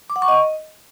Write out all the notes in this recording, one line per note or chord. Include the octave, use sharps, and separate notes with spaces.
D6
F#5
C#6
D#5